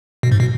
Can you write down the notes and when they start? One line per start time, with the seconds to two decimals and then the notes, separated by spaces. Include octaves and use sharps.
0.23 B2
0.32 G#2
0.40 B2